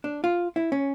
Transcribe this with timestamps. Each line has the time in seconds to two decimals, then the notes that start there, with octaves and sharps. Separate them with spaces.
0.04 D4
0.24 F4
0.56 E4
0.72 C#4